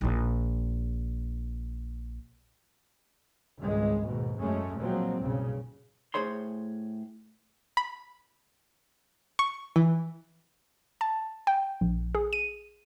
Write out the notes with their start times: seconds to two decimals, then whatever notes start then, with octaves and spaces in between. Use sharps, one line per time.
0.01 A#1 F4
3.58 G#1 C#2 G2 G#3
4.05 D#2 G#2 B2
4.40 F#2 G#3 A3 C#4
4.79 A#2 F3 F#3 G#3 C4
5.20 B1 G2 A#2 C#3
6.14 A2 D#4 G#4 C5 C#5 C6
7.77 B5
9.39 C#6
9.76 E3
11.01 A5
11.47 G5
11.81 A#1
12.15 G#4
12.33 D#7